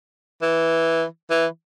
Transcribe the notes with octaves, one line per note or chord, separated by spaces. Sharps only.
E3
E3